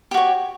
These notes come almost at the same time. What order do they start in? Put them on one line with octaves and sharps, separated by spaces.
G4 F#4 C#5